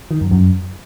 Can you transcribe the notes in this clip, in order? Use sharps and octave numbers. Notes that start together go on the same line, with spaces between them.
D#3
F#2
F#2